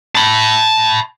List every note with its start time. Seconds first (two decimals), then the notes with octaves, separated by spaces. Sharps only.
0.15 A5 B5